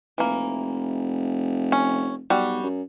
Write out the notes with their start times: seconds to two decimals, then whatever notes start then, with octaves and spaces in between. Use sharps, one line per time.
0.18 F1 E3 A#3
1.72 C#4
2.30 B1 G3 F#4
2.63 F#2